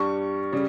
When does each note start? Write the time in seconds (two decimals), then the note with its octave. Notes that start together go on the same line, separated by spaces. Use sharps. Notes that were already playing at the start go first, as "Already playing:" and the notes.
Already playing: G2 G3 C#6
0.53 C#3 G3